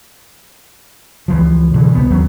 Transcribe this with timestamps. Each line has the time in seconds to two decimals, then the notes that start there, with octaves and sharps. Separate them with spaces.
1.28 C#2 E3 F3
1.74 G2 B2 D3 E3
1.95 C2 B3
2.10 D#2 F#3 G#3 C#4